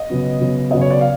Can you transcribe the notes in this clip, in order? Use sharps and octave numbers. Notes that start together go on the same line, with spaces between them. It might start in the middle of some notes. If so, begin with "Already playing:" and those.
Already playing: D#5
C#3 F#3 B3
C#3 F#3 B3
C#3 F#3 B3 D#5
C#5
D5
F5